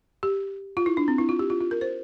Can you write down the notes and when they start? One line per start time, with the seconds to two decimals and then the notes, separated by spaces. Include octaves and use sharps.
0.23 G4
0.77 F4
0.86 E4
0.97 D4
1.08 C4
1.18 E4
1.29 F4
1.39 G4
1.50 F4
1.60 F4
1.71 A#4
1.81 C5